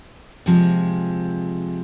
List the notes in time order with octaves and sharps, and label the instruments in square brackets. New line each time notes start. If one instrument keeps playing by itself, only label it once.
[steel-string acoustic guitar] C3 F3 G#3